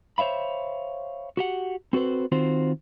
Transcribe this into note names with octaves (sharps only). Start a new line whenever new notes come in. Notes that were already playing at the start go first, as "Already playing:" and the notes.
C5 C#5 E5 F5 B5
F#4 G4 F#5
C4 F#4 A4 B4 C5
D#3 C4 F4 F#4 C5